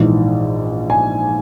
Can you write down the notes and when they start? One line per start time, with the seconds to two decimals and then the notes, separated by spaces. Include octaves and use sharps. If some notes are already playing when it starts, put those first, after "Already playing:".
Already playing: A#1 G#2 E3
0.90 G#5